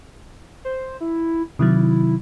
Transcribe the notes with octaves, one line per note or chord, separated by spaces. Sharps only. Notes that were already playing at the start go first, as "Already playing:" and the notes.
C5
E4
C3 D#3 F#3 E4